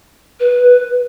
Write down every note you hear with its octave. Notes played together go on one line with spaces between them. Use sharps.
B4